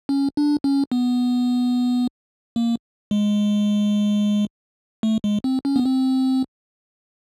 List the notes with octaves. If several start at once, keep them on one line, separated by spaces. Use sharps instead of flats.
C#4
D4
C#4
B3
A#3
G#3
A3
G#3
C4
C#4
B3
C4